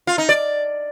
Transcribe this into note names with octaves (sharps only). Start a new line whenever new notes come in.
F4
D#4
D5